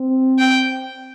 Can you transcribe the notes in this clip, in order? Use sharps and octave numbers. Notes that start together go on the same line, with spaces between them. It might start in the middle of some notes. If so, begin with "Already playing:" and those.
Already playing: C4
G5